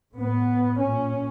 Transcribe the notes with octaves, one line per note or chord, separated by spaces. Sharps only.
A2 B3
A#2 C#4